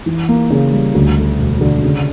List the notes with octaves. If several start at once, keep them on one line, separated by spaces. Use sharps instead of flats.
E3
A#3
C#3
G3
D2
A3
E1
D3
C#3